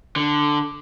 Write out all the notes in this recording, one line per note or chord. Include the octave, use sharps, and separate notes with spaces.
D3